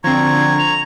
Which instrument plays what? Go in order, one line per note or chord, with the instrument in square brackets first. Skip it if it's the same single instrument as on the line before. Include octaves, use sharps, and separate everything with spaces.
[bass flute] D3 [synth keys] F3 C4 [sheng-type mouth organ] A#5 C#6 [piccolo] G#6
[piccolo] F7